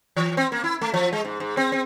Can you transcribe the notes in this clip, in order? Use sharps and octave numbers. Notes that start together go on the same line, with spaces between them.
E3
C4
A#3
E4
A3
F3
G#3
G#2
G#2
C4
C4